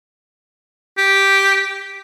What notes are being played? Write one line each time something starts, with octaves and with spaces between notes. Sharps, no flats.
G4